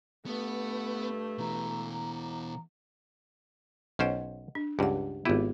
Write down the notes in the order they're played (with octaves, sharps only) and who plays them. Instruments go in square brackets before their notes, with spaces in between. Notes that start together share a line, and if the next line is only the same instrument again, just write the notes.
[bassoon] G2 [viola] A3 [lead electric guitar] B3
[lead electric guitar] B2 E3 [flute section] A#5
[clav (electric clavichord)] B1 C#4 C5 [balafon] D#5 F#5
[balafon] D4
[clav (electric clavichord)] C#2 G2 [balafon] G4 F#5
[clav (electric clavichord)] G#1 E4 [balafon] B3 F4 G4